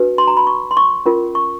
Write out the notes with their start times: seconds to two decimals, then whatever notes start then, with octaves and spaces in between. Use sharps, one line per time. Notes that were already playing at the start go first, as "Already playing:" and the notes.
Already playing: D4 F#4 B4
0.18 C6
0.27 A#5
0.37 B5
0.47 C#6
0.71 C6
0.77 C#6
1.06 C#4 F4 A#4
1.35 C#6